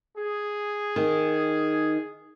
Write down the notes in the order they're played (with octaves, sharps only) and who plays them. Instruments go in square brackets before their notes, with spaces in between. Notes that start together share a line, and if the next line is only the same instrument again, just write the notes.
[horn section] G#4
[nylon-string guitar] D#3